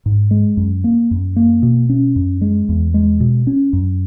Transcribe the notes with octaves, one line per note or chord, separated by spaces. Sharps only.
G#2
G#3
F#2
A#3
F#2
A#3
B2
C#4
F#2
G#3
E2
G#3
B2
C#4
F#2